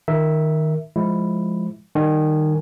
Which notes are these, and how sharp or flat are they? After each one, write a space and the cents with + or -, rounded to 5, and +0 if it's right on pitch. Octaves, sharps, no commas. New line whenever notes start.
D#3 +0 A#4 +0 E5 +0
F3 -5 G#3 +0 E4 +0
D#3 -20 G3 -15 G#5 +0